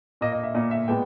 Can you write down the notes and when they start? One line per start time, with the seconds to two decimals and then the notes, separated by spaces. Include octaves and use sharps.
0.21 A#2 A#3 D#5
0.32 D#5
0.43 E5
0.55 A#2 A#3 D#5
0.71 E5
0.88 A#2 G#3 B3 G5